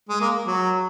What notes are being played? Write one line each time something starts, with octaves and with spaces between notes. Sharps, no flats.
G#3
A#3
F#3